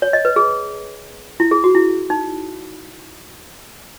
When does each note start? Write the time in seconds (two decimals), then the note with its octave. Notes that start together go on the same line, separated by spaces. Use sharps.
0.02 C#5
0.13 D#5
0.25 B4
0.36 G#4
1.40 E4
1.51 G#4
1.64 F#4
1.75 E4
2.10 D#4